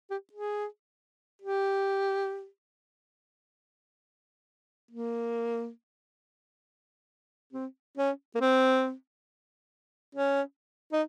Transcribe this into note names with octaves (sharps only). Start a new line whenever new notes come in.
G4
G#4
G4
A#3
C4
C#4
A#3
C4
C#4
D#4